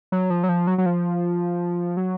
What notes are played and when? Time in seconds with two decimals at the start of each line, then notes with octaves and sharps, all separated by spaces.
0.12 F#3
0.30 F3
0.44 F#3
0.49 F3
0.67 F#3
0.78 F#3
0.86 F3
1.97 F#3